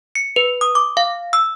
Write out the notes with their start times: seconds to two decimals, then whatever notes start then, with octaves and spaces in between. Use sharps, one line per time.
0.15 C#7
0.36 B4
0.61 D#6
0.75 D6
0.97 F5
1.33 E6